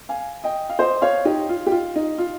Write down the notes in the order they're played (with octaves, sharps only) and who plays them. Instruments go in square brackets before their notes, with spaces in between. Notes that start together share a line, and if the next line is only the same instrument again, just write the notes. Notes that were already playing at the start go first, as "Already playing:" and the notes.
[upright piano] F5 G#5
D#5 G5
F5
C5 D#5
C#5 F5
D#4 G4
F4
G4
F4
D#4
F4